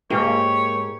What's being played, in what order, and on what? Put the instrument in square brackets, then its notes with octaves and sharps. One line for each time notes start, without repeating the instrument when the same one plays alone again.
[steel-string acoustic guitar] G#2 G4 [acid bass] A#3 [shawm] C#5